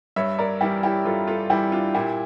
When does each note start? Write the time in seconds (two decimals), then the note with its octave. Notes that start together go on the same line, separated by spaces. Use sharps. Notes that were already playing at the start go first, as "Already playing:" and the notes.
0.16 G2 C#5 E5
0.39 A#4 D5
0.61 E3 G3 E4 G4
0.83 E4 G4
1.06 G2 F4 A4
1.27 F4 A4
1.50 E3 G3 E4 G4
1.72 D4 F4
1.94 A#2 E4 G4